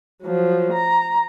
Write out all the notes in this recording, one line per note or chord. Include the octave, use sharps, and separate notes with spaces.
F3 F#3
A#5